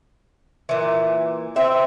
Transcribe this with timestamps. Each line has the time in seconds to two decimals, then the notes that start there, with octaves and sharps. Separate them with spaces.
0.69 A#2 E3
1.56 C4 E5